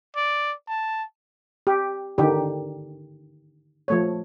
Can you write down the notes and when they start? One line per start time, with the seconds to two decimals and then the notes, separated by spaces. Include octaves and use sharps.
0.16 D5
0.68 A5
1.67 G4
2.18 D3 D#3 G4
3.88 F3 A3 C#5